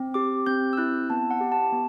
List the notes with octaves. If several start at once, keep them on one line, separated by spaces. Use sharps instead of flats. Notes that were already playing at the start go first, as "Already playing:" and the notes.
Already playing: C4
G4 D6
C4 G6
E6
E4 F#6
B3 A5
F#5
G4
A5
B3